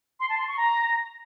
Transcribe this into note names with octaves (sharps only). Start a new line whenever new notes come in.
C6
A5
C6
C#6
A#5